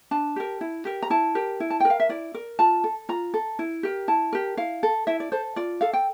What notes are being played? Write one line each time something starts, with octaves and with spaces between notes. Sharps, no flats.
D4 A5
G4 A#4
E4
G4 A#4
A#5
E4 A5
G4 A#4
E4
A5
A#4 G5
F5
E5
E4 D5
A#4
F4 A5
A4
F4 A#5
A4
E4
G4 A#4
E4 A5
G4 A#4
E4 F5
A4
E4 E5
D5
A4 C5
F4 D5
A4 F5
G5